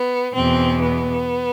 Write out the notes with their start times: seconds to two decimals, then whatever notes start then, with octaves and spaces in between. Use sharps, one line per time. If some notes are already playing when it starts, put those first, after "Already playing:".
Already playing: B3
0.35 E2 B2 C4
0.82 B3